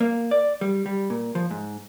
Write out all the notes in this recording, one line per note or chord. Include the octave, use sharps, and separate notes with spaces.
A#3
D5
G3
G3
A#2
F3
G#2